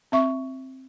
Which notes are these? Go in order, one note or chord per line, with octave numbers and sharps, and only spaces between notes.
C4 E5 C#6